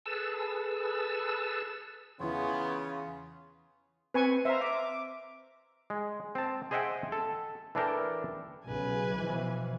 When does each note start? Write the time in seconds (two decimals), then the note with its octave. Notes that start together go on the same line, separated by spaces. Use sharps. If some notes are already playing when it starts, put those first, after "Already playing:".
0.06 G#4 A4 B4 A5 E6
2.20 E2 C#3 E3 B3 F4 C#5
4.14 C4 B4 G#5 C#6
4.45 C5 E5 F5 A#5
4.61 E5 D6
5.90 G#3
6.35 C4 A5
6.71 G#4 C5 D#5 E5 F#5 G5
7.12 A4
7.75 E3 D4 A4 A#4 G5
8.66 B1 C#3 B4 G#5
9.14 B2 E3 F3